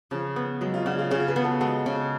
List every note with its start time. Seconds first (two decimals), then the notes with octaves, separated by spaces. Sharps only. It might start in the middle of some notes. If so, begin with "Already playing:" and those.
0.11 C#3 F3
0.36 B3
0.61 F#3 G#3
0.73 C#4 F4
0.86 C#3 D4 F#4
0.98 F4 G#4
1.11 C#3 F4 G#4
1.28 G#4 B4
1.36 B3
1.44 F#4 A4
1.60 G#3 F#4 A4
1.86 C#3